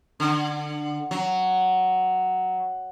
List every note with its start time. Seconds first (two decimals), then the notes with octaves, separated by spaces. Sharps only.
0.20 D3
1.11 F#3